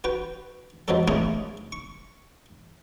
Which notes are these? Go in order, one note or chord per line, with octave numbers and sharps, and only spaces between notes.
F#4 B4 G5
F2 F3 F#3 G#3 C4 A4
A3 A#3 C4 C#4 E4 G#4
C#6